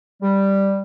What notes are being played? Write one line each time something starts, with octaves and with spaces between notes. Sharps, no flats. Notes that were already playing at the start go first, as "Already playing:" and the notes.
G3